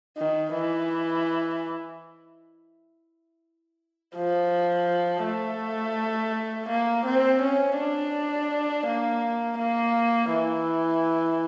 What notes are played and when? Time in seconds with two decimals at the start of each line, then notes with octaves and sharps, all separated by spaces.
0.18 D#3
0.54 E3
4.16 F3
5.25 A3
6.69 A#3
7.06 C4
7.42 C#4
7.78 D4
8.87 A#3
9.59 A#3
10.31 E3